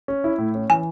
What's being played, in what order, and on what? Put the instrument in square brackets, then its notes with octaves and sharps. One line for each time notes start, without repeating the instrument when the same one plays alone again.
[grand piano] C#4
E4
A2
C#4
[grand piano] E3 [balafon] G#5